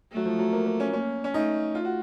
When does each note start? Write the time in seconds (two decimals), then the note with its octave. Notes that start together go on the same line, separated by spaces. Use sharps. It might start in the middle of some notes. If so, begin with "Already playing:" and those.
0.12 F#3 A3
0.25 F3
0.39 F#3
0.53 A#3
0.66 A#3
0.80 C#4
0.93 A#3 C#4
1.24 C#4
1.34 A3 D#4
1.75 F4
1.85 F#4